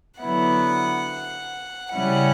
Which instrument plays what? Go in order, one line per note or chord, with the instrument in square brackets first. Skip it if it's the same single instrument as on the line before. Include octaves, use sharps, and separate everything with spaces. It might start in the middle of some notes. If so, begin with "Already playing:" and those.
[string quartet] D3 F#3 B3 E4 F#5
C#3 G3 C#4 E4 F#5